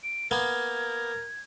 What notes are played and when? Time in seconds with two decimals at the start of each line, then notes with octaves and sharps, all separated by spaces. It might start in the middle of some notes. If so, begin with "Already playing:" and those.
0.03 D7
0.31 A#3 B3 A#4 G#6